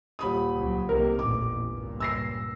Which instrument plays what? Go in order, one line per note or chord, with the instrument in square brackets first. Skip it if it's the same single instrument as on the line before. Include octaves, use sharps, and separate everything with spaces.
[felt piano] D#1 B5 D#6
[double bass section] C#2 F#3
[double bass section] C2 D#3 A#3 [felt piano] C3 A#4
[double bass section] A1 E2 A#2 [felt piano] D6
[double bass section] C#2 G2 A#2
[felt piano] E6 A#6 C7